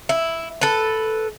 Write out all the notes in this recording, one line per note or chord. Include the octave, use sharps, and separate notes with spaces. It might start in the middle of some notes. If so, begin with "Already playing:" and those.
E4
A4 B4